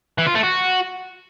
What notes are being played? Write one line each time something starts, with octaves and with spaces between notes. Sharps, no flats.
E3
F4
A3
F#4